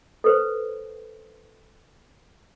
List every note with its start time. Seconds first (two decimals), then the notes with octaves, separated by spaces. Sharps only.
0.24 A4 B4 C5